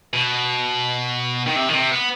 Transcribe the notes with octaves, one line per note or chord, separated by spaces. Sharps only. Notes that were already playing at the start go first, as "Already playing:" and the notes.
B2
D#3
C3
D#3
C3
B3